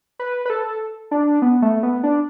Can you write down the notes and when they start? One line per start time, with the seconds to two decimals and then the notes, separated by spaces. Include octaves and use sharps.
0.19 B4
0.46 B4
0.50 A4
1.11 D4
1.42 B3
1.62 A3
1.83 B3
2.03 D4